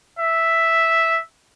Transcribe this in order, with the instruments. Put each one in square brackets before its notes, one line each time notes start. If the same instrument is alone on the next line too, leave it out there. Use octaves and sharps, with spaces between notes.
[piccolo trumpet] E5